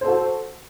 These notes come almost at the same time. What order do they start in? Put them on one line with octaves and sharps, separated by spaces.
C5 A4 F#4